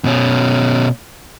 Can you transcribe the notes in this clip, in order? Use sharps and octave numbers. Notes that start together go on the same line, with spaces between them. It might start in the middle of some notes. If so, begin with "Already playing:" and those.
B2 C#4